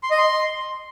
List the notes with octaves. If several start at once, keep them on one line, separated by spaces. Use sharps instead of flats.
C6
D#5
C6